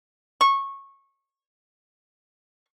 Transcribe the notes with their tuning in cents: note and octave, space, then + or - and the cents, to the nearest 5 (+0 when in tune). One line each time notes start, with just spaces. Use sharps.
C#6 -20